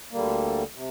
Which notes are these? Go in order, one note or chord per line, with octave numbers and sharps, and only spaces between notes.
D2 D3 G3 A#3
C3